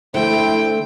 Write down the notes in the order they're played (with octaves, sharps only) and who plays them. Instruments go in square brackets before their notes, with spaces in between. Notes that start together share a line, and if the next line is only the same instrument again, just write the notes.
[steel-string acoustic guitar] D3 A3 [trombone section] E4 C5 [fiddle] G5